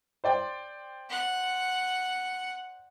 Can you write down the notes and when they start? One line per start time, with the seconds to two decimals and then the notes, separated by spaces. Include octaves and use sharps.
0.24 C5 D5 G5
1.11 F#5